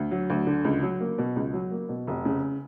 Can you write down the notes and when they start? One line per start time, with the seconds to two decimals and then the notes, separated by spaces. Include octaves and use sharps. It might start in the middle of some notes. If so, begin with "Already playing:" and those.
Already playing: D2
0.11 F#3
0.30 D2
0.47 D3
0.65 C#2
0.83 F#3
1.01 A#3
1.18 B2
1.36 C#2
1.54 F#3
1.71 A#3
1.89 B2
2.07 F1
2.25 C#3